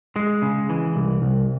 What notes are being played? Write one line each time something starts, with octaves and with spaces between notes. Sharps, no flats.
G#3
C#3
E3
C2
C2